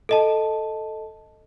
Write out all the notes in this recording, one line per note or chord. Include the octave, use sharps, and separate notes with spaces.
A4 D#5 A5